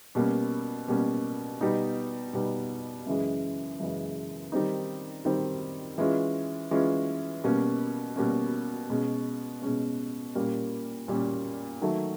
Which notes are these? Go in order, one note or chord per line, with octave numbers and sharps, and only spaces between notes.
B2 G3 A#3 C#4
B2 G3 A#3 C#4
B2 G3 B3 D#4
B2 G3 B3 D#4
F#2 C#3 E3 G#3
F#2 C#3 E3 G#3
D#3 G3 C4 D#4
D#3 G3 C4 D#4
E3 G#3 C#4 F4
E3 G#3 C#4 F4
B2 G3 A#3 C#4
B2 G3 A#3 C#4
B2 G#3 C#4
B2 G#3 C#4
A#2 G3 A#3 C#4
A#2 G3 A#3 C#4
D#3 F#3 A3